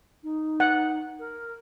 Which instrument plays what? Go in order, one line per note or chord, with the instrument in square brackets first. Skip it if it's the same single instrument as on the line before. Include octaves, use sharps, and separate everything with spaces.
[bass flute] D#4
[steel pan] F#5
[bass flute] A#4